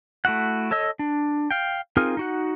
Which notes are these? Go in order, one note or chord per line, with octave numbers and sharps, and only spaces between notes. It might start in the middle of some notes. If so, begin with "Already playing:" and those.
A3 E4 F#4 F#5
A4 C#5 D#5 E6
D4
F5 G5
C4 D#4 F4 G#4 A#4
D#4 F#4 F#5